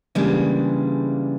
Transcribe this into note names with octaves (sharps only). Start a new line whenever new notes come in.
C#3 E3 G3 G#3 A#3 D4